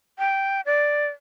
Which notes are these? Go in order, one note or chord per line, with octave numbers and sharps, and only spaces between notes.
G5
D5